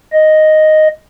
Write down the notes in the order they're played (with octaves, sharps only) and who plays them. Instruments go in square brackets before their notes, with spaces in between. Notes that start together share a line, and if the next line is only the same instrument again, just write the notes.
[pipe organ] D#5